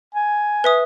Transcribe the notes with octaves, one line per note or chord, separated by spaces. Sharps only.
G#5
B4 E5 D#6